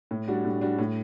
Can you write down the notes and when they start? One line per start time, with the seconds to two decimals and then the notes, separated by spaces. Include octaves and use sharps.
0.11 A2
0.28 G3 D4 F#4
0.45 A2
0.61 G3 D4 F#4
0.78 A2